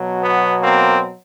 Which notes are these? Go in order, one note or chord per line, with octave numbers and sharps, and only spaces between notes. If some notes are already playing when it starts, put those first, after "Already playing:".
Already playing: B2 F#3
B3
A#3 C4